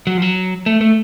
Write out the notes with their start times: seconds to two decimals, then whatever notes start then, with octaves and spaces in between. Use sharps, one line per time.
0.07 F#3
0.17 F3
0.22 F#3
0.66 A3
0.81 A3